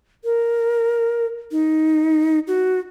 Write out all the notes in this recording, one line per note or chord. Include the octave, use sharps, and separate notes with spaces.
A#4
D#4
F#4